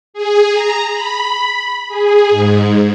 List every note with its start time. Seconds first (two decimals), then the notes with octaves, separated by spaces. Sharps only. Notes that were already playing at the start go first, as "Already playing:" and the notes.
0.14 G#4
0.53 A#5
0.93 B5
1.89 G#4
2.30 G#2